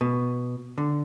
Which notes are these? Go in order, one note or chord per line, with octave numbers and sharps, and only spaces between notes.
B2
D3